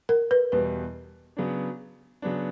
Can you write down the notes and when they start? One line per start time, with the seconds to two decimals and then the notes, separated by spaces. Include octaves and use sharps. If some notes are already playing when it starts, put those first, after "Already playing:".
0.09 A#4
0.31 B4
0.52 E2 B2 G3 B4
1.37 C#3 F#3 B3 D4
2.22 C#3 F#3 B3 D4